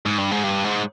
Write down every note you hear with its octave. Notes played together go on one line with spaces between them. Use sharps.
G#2
G2
G#2
G2
G#2